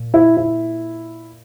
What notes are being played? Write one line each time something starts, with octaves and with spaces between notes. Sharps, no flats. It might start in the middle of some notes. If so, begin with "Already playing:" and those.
Already playing: A#2
E4
E4